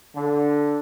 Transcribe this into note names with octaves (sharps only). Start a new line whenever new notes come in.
D3